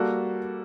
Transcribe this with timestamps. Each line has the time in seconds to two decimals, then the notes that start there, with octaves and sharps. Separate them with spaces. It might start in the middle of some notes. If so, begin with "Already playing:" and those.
Already playing: G3 A#3 F#4 A4